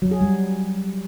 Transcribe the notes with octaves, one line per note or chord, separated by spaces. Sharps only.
F#3
G#4
G3